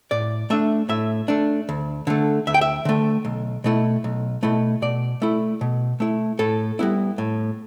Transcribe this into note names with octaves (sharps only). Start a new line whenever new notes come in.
A2 D5
A3 D4 E5
A2 E5
A3 D4
D2
D3 A3
D2 E5
G5
E5
D3 A3
B1
B2 A3 E4
B1
B2 A3 E4
B2 D5
A3 E4
B2
A3 E4
A2 A4
G3 B3 E4
A2